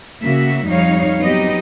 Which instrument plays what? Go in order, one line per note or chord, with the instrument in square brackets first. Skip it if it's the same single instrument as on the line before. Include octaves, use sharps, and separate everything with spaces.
[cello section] C#3 A#3 F#4 E5
F2 G3 D#4 C#5 F5
F#3 B3 C4 D#4 G4 D#5